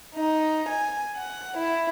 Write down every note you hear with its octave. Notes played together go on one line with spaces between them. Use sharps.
D#4
G#5
F#5
E4